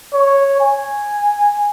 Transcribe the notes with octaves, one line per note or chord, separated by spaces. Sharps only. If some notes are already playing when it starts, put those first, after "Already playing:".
C#5
G#5